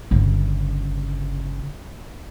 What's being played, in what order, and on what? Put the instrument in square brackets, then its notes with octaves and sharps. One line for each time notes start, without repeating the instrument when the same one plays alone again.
[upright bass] G1 C#3